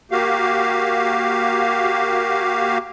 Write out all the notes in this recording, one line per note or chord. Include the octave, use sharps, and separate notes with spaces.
A#3 F#4 G4 F5